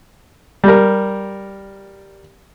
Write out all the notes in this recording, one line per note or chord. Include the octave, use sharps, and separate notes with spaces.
G3 A#4